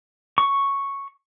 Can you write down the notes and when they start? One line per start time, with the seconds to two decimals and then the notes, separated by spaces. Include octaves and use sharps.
0.38 C#6